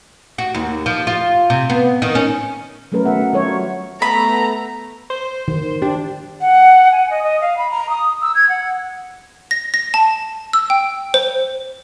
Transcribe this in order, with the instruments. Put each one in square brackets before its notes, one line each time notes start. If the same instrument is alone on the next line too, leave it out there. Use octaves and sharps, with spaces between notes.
[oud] F#4
D#2
F3
F4
C3
B3
D#3
C#4
[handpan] F#3 A3 C#4 A#4 B4
D#3 A3 B3 E5 F#5
D#4
D#3 G3 F4 F#4 A#4 C#5
[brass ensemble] A3 B3 [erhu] A#5 [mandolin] B5
[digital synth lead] C5
[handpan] D#3
[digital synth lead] D4 [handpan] G4
[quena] F#5
G#5
D#5
D#5
F5
B5
A#5
D#6
E6
G#6
F#5
[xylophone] A#6
A#6
A5
E6
G5
C5